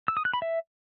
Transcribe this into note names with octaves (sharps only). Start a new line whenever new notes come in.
E6
D#6
F#6
B5
E5